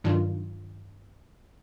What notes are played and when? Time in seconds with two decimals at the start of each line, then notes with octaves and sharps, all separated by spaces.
0.04 G2 D#3 F#3 D4 F4